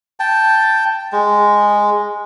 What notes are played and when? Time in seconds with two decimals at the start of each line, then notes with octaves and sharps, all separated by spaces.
0.20 G5 A5
1.13 G#3